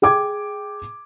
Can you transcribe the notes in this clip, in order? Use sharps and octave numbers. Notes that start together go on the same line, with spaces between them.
G#4 G5 D6 G#6